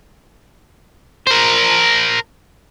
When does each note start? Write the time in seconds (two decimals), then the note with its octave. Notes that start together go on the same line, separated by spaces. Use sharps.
1.27 A#4 C5